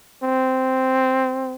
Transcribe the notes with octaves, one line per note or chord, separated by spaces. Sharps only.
C4